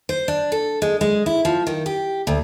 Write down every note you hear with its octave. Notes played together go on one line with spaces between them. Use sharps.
C5
D4
A4
G#3
G#3
E4
F3
D#3
G4
D2